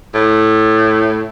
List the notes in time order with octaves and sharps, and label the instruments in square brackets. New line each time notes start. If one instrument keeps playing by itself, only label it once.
[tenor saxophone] A2